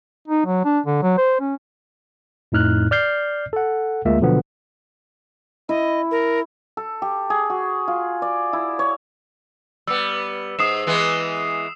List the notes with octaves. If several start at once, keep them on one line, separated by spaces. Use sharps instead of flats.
D#4
F#3
D4
D3
F#3
C5
C#4
F2 A2 D#4 F6 F#6
D5 F6 G6 C7
A4 F#5
D2 G#3 A#3 F4 E5
B2 D3 F3 F#3 B3
E4 D#5
A#4
A4
G4
G#4
F#4
F4
D5
E4
C#5
G3 B3 E6
G#2 D#6 C7 E7
E3 G#3 B3